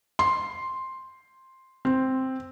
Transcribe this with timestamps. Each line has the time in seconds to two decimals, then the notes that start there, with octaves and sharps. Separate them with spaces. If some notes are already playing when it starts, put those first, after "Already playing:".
0.19 C6
1.85 C4